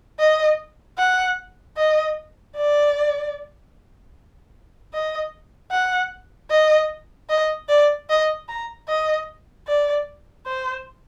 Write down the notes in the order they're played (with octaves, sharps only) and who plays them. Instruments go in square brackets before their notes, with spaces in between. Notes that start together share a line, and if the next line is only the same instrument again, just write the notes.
[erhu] D#5
F#5
D#5
D5
D#5
F#5
D#5
D#5
D5
D#5
A#5
D#5
D5
C5